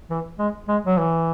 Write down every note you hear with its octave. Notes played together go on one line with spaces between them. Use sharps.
E3
G#3
G#3
F#3
E3